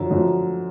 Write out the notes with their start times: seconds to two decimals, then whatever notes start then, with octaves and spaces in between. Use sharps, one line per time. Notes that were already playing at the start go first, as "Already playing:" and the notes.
Already playing: F#2 D3 F3
0.11 F#2 D3 F3